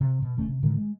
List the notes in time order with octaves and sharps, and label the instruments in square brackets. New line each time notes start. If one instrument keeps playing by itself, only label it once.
[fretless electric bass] C3
B2
F1 D#2 A3 C#4
C3
A2 D3 D#3 G#3
G#3